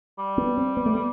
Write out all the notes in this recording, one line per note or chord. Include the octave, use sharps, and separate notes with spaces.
G3
B3
C4
B3
A3
B3